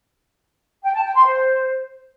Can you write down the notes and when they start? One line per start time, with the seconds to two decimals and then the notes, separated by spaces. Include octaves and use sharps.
0.83 G5
0.94 A5
1.04 G5
1.14 C6
1.25 C5